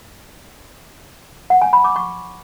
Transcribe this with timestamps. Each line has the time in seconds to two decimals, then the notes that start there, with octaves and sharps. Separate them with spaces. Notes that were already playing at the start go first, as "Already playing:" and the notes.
1.50 F#5
1.62 G#5
1.73 B5
1.84 D6
1.96 C#6